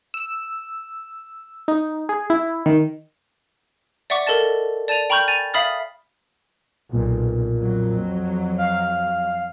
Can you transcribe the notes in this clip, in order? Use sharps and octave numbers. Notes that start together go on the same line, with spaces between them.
E6
D#4
G#4
E4
D#3
D5 E5 F#5 C#6 D6
A4 A#4 D#5 A5 A6
D5 A5 A6 D#7 F7
G5 A#5 B5 C#6 F6 G6
G#5 A6 D#7 F7
E5 F5 B5 D#6 F6 A6
B1 A#2
F2 F#3
F5